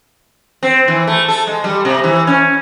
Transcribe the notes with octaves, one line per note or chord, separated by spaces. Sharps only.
C4
E3
A3
A4
G#3
G3
C3
E3
C#4